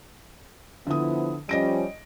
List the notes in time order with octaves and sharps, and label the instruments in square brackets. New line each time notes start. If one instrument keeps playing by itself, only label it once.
[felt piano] D3 D#6 [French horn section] F3 B3 E4
[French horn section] F3 G3 C#4 [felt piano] D#5 A#6 D7